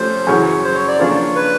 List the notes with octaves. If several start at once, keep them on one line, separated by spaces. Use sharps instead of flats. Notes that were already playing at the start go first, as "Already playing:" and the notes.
Already playing: C3 F3 A3 C#4 C5
F#2 C#3 E3 C#5
C5
C#5
D5
C#3 F3 A#3 D4 F4 C#5
B4